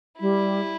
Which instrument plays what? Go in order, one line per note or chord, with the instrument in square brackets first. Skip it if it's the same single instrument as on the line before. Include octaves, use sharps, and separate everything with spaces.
[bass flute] G3 [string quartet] E4